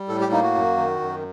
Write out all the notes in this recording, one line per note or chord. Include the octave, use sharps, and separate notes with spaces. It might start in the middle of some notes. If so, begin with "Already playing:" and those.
Already playing: G3
A2 A4
G4
A#3 D#4
F#4
F#2
D#3
F#2